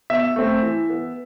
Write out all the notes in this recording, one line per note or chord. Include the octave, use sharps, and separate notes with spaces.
B2 E5
A3 C4
E3
B3